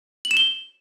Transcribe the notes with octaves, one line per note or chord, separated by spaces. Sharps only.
F#7
E7
G7